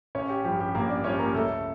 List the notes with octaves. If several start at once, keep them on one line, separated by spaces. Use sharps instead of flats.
A1 C#4 C#5
G4
G2 F3 G4
G4
A1 A#3 A#4
D4 D5
G2 F3 C#4 C#5
A#3 A#4
C#2 A3 A4